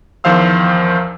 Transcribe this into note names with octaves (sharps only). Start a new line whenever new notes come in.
E2 D#3 F3 C5 F5 E6